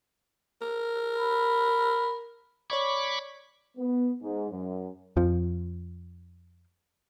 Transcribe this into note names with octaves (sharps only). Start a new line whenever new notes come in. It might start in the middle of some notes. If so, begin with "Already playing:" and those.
A#4
B5
C#5 D5 B5 C#6 D6 G#6
B3
G#2
F#2
F2 F3